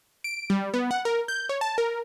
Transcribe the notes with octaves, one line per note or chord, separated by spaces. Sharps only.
D7
G3
B3
F#5
A#4
G6
C#5
A5
A#4